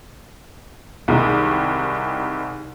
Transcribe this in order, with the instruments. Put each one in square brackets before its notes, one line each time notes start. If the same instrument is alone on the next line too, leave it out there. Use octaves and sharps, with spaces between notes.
[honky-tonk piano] C2 D#3 G#3